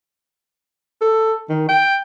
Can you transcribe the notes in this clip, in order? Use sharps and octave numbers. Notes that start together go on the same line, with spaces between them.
A4
D#3
G5